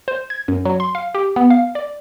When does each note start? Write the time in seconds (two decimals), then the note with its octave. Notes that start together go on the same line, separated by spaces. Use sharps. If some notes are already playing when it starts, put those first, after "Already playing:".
0.08 C5
0.30 G#6
0.48 F#2
0.65 F#3
0.80 C6
0.95 F5
1.15 G4
1.36 B3
1.50 F5
1.75 D5